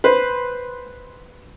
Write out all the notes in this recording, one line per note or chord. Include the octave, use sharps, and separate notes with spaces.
B4 C5